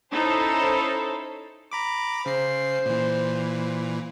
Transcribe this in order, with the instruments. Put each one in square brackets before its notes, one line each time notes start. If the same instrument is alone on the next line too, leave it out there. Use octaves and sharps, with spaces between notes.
[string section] C#4 D#4 E4 A4 C5
[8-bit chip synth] A#5 B5 D6
[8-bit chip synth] C#3 C7 [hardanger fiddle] C5
[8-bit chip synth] A#2 E3